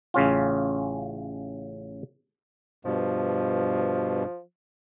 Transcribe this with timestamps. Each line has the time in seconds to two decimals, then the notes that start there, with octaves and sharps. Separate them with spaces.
0.14 A1 C#3 C#4 F4
2.85 G2 B2 F3